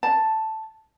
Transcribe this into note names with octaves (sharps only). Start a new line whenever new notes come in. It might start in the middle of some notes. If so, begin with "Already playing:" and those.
A5